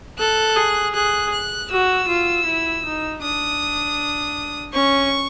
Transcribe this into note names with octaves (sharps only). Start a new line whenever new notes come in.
A4 F#6
G#4
G#4 F#6
F#6
F#4 E6
F4
E4
D#4
D4 D#6
C#4 C#6